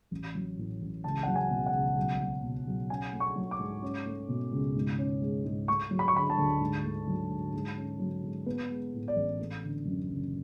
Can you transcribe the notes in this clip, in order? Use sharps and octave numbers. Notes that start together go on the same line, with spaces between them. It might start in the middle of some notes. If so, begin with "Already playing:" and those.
A1
F#3
A2
A1
C#2 A5
F#3 F#5
G#5
B2
F#5
C#2
B1
F#3
B2
B1
C#4 G#5
A3
C#6
F#3
D6
G#2
C#4
A3
B2
C#2
G#2
C#4
G#3
G#2
A3 C#6
F#3
B5
C#6
D3 B5
A5
D2
G#2
A3
F#3
G#2
G#2
C#4
F#3
G#2
B3 B4
G#3
A2
D5
A1
A3
D3
F#2
F#1